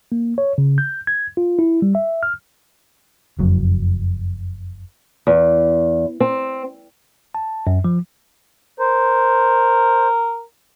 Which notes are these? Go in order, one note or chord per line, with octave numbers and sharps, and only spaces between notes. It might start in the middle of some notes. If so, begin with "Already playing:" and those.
A#3
C#5
C#3
G6
G#6
F4
E4
G3
E5
F6
F#1 F2 F#3
E2
C4
A5
F#2
F3
A#4 C5